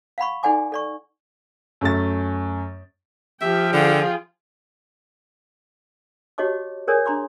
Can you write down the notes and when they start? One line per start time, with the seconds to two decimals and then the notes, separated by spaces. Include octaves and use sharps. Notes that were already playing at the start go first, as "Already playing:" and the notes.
0.18 F5 F#5 B5 C#6
0.43 D#4 A4 D5 F#5 G#5 D6
0.72 A4 D5 C#6
1.81 F#2 A3 A6
3.42 F3 G4 E5 G5
3.73 D3 F4 G#4
6.38 F#4 G4 C#5 D#5 A5 D6
6.87 G#4 A#4 C#5 D5 G#5 D#6
7.06 D4 A#5 C6 D6